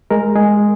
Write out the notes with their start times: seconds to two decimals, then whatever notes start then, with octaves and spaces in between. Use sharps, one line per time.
0.10 G#3 A#4
0.35 G#3 G#4